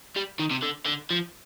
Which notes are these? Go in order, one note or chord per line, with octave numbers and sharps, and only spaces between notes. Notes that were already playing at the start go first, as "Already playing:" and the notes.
G3
D#3
C3
D3
D3
F3